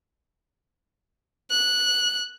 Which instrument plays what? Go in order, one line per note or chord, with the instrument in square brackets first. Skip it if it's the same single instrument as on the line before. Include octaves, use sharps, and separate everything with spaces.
[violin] F#6